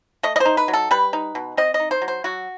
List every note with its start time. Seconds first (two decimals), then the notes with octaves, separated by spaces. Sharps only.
0.23 A3 D#5
0.36 D#5
0.40 C5
0.45 D#4
0.57 B4
0.68 F#3
0.73 A4
0.91 G3 B4
1.13 D#4
1.35 B2
1.57 C4 D#5
1.74 D#5
1.80 D#4
1.91 C5
2.02 F#3
2.08 C5
2.24 F#3 F#4